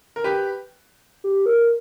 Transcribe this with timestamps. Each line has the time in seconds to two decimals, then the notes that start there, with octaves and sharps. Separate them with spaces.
0.16 A#4
0.24 G4 B4
1.24 G4
1.46 A#4